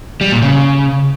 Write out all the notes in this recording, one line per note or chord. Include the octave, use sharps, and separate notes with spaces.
G3
A#2
C#3